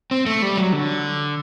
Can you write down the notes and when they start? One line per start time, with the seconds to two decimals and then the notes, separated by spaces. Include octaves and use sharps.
0.11 C4
0.26 A3
0.42 G3
0.57 F#3
0.73 D3